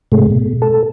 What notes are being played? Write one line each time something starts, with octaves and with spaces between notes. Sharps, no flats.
G#2 C3 G#3 A3
B2
A4